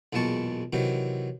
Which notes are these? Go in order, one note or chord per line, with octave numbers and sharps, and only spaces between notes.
B1 E2 A#2 G#3 A5 C#6
C3 D#3 E3 F#3